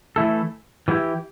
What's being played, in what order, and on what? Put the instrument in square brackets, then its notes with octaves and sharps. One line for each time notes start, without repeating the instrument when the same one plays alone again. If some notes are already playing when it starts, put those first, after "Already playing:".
[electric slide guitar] E3 A3 E4 A4
E3 G3 B3 E4 G4